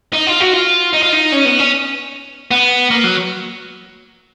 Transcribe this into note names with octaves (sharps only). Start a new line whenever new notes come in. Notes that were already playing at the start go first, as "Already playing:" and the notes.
D#4
F4
F#4
F4
D#4
F4
D#4
C#4
B3
C#4
B3
A#3
F#3